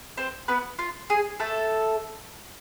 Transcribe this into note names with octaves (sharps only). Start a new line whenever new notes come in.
C4 C5
B3 B4
F4
G#4
A3 A4